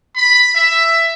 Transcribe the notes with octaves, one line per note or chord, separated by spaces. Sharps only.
B5
E5